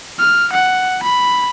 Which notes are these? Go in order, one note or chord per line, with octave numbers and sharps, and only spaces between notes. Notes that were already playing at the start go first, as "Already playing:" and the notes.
F6
F#5
B5